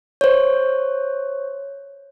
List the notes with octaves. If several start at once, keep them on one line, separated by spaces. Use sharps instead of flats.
C5 C#5